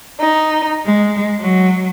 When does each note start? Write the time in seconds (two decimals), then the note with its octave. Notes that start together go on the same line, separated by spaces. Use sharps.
0.18 D#4
0.86 G#3
1.38 F#3